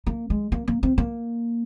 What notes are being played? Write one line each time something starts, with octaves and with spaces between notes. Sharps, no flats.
A#3
G#3
A#3
A#3
C4
A#3